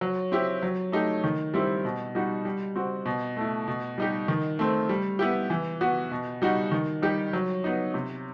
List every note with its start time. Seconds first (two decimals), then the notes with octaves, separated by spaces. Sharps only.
0.01 F#3
0.32 C4 E4 G4
0.63 F#3
0.92 A3 D#4 G4
1.24 D#3
1.54 G3 C4 E4 G4
1.85 B2
2.15 G3 D#4 F#4
2.45 G3
2.76 C4 F#4
3.06 B2
3.37 A3 E4
3.68 B2
3.98 G3 D#4 G4
4.28 D#3
4.59 A3 C4
4.89 G3
5.19 B3 E4 G4
5.50 E3
5.81 B3 F#4
6.11 B2
6.42 G3 D#4 F#4
6.72 D#3
7.02 G3 D#4 G4
7.33 F#3
7.64 B3 D#4
7.94 C3